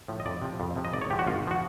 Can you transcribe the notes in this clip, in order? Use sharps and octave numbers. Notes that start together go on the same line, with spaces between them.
A2 F3
D#5
F2 D5
C3 F3
F2
C3 F3
D#5
G#1 D5
C#5
G#2 F3 G4
F#4
G#1 F4
F3 F#4